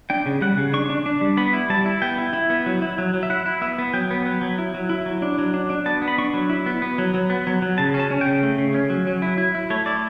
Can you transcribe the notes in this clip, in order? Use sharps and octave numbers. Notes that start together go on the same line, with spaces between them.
D4 G5
C#3
G3 F#5
C#3
D4 C#6
D4
D4
G3
B3 B5
E4
G3 A5
E4
B3 G5
E4
E4
B3
F#3
E4
F#3
F#3
E5
E4 F#5
E4
B3 E5
B3
F#3 G5
B3
F#3
F#3
E4
F#3
E4
F#3
D4
F#3
D4
D4
B3 A5
B3
B5
D4 C#6
F#3
E4
B3
B3
F#3
F#3
B3
F#3
F#3
C#3 A5
C#4
A5
C#4
G5
C#3
A3
C#3
C#4
F#3
F#3
E4
E4
E4
A3 C#5
E4 D5